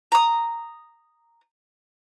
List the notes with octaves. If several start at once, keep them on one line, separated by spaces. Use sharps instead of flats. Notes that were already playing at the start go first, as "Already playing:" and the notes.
A#5 D#6